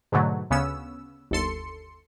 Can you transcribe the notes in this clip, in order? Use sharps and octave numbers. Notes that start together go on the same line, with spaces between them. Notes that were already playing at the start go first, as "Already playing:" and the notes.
G#2 B2 D3 F#3 A3
D2 C#3 B3 C#4 E6
G1 D#2 A4 C6 C#7